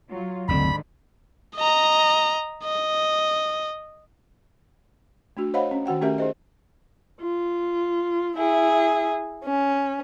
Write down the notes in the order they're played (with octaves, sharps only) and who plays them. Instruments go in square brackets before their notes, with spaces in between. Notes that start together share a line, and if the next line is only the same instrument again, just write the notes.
[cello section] F#3 F4
[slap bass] F#1 D2 C4 [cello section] G#2 D3 D#3 [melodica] B5
[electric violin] D#5 A#5
D#5
[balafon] A3 D4 F#4
C5 C#5 D#5 F5 F#5 B5
C#4
D#3 F#4 F#5 G5
A3 C#4 G4 A4 A#4 E5
D#4 G#4 C5 D#5
[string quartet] F4
E4 G#4 E5
C#4